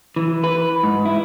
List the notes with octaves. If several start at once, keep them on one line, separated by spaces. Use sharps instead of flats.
E3
B4
G#2
E4